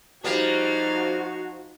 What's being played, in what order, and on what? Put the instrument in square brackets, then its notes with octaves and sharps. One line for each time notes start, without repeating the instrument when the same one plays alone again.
[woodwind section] F3 [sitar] G3 A#3 [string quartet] D#4 F5 G#6 [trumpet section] F#4